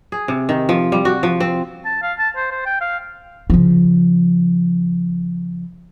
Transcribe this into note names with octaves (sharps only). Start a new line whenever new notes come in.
G#4
C3
D#3
F3
G3
F#4
F3
C4
A5
F5
A5
C5
C5
G5
F5
C#3 F3